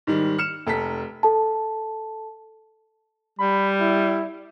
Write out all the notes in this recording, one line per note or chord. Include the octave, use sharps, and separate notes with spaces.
G#2 D#3 G3
F6 C#7 E7
F1 A4 A#5 B6
A4 A5
G3 B5
E4